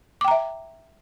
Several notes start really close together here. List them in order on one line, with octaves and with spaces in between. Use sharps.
D6 G5 A#5 E5